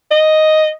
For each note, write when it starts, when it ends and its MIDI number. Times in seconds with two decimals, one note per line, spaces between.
0.11 0.71 75